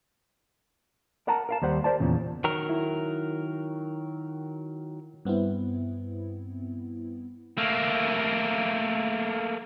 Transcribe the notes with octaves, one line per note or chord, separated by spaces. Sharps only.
A#4 F#5 A5 A#5
A#4 F5 A5
D#2 G3 C5 F#5
A#4 C5 D5 A5
E2 A#2 C#3
D#3 F#3 A#4
E4
G2 B3 C4 E4
A3 A#3